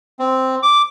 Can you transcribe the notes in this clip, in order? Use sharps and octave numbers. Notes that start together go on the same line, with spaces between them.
C4
D6